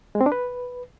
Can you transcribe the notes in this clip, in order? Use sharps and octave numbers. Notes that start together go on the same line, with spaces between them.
G#3
C4
D4
B4